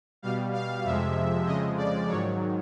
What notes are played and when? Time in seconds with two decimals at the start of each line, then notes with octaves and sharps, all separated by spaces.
0.22 B2 G3 F5
0.53 F5
0.84 F2 C3 F3 G#3 E5
1.46 F2 C#3 F3 G#3 D#5
1.77 D5
2.08 G#2 D#3 F#3 C#5